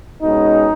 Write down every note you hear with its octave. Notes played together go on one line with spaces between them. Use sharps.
B2 G#3 C#4 D#4